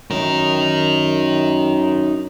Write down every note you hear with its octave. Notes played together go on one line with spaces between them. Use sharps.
F#2 D#4 A#4